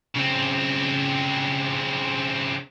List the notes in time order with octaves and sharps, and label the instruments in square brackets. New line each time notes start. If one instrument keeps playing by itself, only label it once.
[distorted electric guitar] C#3 C4